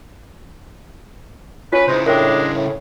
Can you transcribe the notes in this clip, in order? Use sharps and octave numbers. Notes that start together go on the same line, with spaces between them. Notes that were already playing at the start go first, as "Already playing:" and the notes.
C#4 F4 B4
C#3 E3 G#3 D#4 E4 C5
A2 G#3 D4 A#4 G5
A2